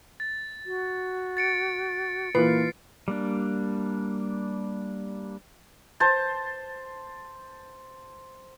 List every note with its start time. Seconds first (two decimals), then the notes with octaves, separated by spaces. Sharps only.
0.20 A6
0.66 F#4
1.37 A6 C#7 D7
2.35 A#2 E3 A#3 F4 B4 C7
3.08 G3 A#3 D4
6.00 C5 A5